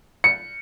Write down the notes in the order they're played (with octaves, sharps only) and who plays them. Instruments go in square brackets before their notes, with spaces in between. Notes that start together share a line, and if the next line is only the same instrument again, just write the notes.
[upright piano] C#7